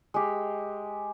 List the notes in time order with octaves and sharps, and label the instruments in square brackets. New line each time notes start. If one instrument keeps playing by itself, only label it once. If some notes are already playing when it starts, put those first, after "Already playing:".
[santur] G#3 G4